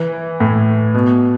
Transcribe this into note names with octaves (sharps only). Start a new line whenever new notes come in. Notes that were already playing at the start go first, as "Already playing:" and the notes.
Already playing: E3
A2
B2